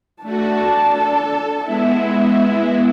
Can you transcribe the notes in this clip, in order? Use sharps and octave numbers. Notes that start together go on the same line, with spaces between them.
A3 D4 F#4 A5
A4
G#3 B3 E4 E5